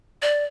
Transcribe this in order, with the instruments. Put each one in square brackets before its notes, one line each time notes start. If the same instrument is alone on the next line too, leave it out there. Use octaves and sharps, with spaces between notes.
[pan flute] D5